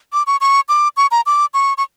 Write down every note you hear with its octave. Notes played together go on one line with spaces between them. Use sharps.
D6
C#6
C#6
D6
C#6
A#5
D6
C#6
C#6